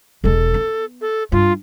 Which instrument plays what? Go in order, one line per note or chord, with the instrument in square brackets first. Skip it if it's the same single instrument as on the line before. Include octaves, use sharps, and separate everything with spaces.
[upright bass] E1 G#3 [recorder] A4
[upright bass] B3
[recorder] A4
[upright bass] G2 [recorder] F4